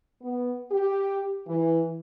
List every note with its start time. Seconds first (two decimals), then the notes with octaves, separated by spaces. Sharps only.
0.22 B3
0.71 G4
1.48 E3